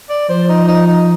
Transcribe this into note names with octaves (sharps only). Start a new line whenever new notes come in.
D5
F3 C5
D#4
D#4
D#4